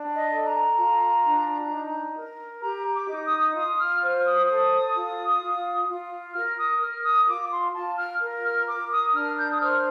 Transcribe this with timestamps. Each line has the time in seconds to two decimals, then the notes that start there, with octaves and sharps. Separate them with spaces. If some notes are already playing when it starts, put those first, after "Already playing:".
Already playing: D4
0.14 D#5
0.30 A4
0.46 A#5
0.76 F4
1.23 D4
1.70 D#4
2.16 A#4
2.63 G4 A#5
2.94 D6
3.09 D#4
3.25 D#6
3.55 F4 D#6
3.79 F6
4.02 C5 F6
4.26 D#6
4.48 A4 D#6
4.95 F4
5.41 F4
5.88 F4
6.34 A#4 F6
6.58 D#6
6.81 A#4 F6
7.04 D#6
7.28 F4 D6
7.51 C6
7.74 F4 A5
7.98 F6
8.21 A#4
8.43 F6
8.67 A#4 D6
8.90 D#6
9.13 D4 F6
9.37 G6
9.51 D#6
9.60 C5 F6